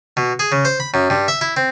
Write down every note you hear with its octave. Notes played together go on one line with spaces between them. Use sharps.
B2
G#4
C#3
C5
B5
F#2
G2
E5
E4
C4